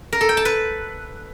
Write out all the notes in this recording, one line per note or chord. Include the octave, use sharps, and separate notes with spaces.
A#4
A4
G5
A5
B4